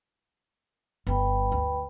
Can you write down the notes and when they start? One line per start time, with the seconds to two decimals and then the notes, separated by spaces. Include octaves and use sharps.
1.07 G1 G3 B4 G5 B5
1.52 D2